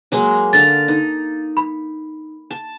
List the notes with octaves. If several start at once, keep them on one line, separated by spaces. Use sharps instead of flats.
F#3 G#3 A#3
D3 F5 A#5 A6
D#4
B5
A5